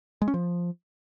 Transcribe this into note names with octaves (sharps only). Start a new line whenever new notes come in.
G#3
C#4
F3